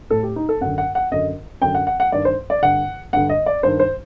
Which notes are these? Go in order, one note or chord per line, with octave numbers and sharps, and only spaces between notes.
A2 A4
G4
D#4
A4
F#2 D3 F#5
F#5
F#5
F#2 D3 D#5
F#2 D3 G5
F#5
F#5
F#5
G2 D#3 D5
C5
D5
G2 D3 F#5
G2 D3 F#5
D#5
D5
G2 D#3 C5
C5